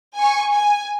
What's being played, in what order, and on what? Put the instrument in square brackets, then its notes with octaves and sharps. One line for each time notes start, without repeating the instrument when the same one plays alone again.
[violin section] G#5 C#6
G#5